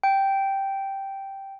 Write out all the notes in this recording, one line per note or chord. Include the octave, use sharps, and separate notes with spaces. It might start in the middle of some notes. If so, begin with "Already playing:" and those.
G5